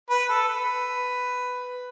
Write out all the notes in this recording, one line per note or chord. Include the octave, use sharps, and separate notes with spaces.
B4
A4
B4